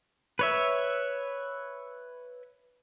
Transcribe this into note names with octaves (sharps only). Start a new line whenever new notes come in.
B4 C#5 E5